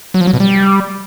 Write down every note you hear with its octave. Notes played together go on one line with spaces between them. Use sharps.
F#3
F3
F#3
B2
G3